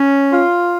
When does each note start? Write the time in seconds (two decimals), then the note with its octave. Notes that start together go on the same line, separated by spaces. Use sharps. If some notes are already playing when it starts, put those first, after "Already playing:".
Already playing: C#4 C#5
0.32 F4